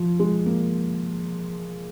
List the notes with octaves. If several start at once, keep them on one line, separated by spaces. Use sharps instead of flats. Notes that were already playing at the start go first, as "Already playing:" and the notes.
Already playing: F3
G#3
A#3